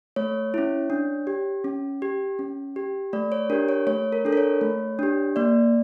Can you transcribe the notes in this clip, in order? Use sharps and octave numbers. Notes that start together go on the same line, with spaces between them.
A3 C#5
C#4 E4
D4
G4
C#4
G4
C#4
G4
A3 D5
C#5
D4 G4 A#4
C#5
A3 C#5
A#4
D4 A4
A#4
C#5
A3
D4 G4
A#3 D5